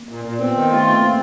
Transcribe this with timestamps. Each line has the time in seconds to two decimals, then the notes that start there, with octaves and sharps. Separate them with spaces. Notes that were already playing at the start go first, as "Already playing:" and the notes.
Already playing: A#3
0.09 A#2
0.24 A#2
0.39 B3 C4
0.54 D#3
0.70 A3 F4
0.85 C4
1.00 A#3 C4